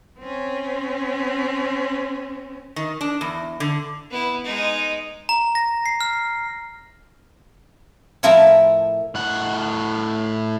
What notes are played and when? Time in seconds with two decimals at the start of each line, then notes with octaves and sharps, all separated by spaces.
0.20 C4 C#4
2.76 D#3
3.01 D4
3.21 E2
3.60 D3
4.10 B3 E4
4.45 G#3 D#4
5.29 A#5
5.55 A#6
5.86 C7
6.01 F6
8.23 A2 F3 E4 A#4 E5 A5
9.15 A2 F#5